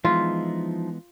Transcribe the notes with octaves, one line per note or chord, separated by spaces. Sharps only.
E3 F3 G#3 B3 D#4 F4 E5